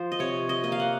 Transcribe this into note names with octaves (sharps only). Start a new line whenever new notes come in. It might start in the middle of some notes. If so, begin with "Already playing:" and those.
Already playing: F3 C5
D#5
C3 C#5
D#5
A#3 D#5
F5
F#5